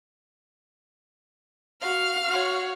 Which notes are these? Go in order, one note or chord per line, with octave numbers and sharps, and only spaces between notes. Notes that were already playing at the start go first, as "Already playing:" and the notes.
F#4 F5 F6
F#4 C#5